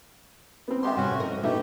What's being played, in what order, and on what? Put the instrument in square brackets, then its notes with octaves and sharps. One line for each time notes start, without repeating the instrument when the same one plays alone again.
[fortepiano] B3 C4
[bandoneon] G#3 B3 G4 [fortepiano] E5 G5 C6
[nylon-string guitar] A2 C3 G3 [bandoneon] C#4 F#4
[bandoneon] G#2 F3 [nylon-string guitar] A#4 D#5
[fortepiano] B2 D#4 E5 [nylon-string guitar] A3 [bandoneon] G4